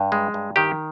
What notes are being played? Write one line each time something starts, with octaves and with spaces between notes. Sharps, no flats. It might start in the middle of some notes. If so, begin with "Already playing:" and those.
Already playing: G2
G#3
G2
D#3 G4